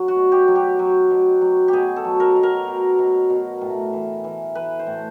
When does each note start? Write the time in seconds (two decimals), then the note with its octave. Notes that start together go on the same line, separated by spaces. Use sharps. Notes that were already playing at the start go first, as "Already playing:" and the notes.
Already playing: F#3
0.08 F#4
0.16 B2
0.32 G4
0.48 F#3
0.55 G4
0.79 F#3
1.10 B2
1.41 F#3
1.68 G4
1.73 B2 G#4
1.96 A4
2.05 F#3
2.20 A#4
2.36 B2
2.43 A#4
2.67 B2
2.99 B2
3.30 B2
3.61 A2
3.93 E3
4.24 E3
4.55 E3 B4
4.79 C5
4.87 A2